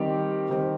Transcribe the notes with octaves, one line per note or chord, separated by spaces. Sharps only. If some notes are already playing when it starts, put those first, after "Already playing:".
Already playing: D#3 G3 C4 G4 C5
D#3 G3 C4 G4 C5